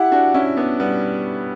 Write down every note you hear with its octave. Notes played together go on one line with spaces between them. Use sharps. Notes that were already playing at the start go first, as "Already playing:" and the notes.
Already playing: E4 G4 F#5
D4 F#4
C#4 E4
B3 D4
G3 B3